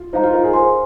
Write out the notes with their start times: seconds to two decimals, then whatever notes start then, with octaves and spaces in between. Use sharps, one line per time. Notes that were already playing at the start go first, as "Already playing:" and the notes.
Already playing: F4
0.13 D#4 C5 F5 A#5
0.23 F4
0.33 A#4
0.44 G#4
0.53 C5 G#5 C6